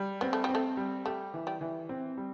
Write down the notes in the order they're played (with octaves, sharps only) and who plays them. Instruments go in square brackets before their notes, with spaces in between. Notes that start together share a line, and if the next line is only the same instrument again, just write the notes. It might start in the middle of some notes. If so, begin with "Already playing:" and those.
Already playing: [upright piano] G3
[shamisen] B3 [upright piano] C4
[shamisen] A3
[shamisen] G3 [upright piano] C4
[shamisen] A3
[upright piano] G3
[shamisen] A3 [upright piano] G4
[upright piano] E3
[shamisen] G3
[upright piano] E3
C4
G3